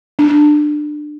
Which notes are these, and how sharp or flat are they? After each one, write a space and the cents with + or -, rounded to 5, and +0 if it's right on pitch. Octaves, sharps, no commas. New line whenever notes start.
D4 +20